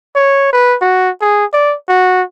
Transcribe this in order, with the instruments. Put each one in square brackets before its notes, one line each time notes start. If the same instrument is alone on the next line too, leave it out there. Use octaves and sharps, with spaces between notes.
[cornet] C#5
B4
F#4
G#4
D5
F#4